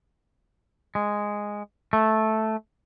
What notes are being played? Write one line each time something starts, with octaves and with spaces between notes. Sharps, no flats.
G#3
A3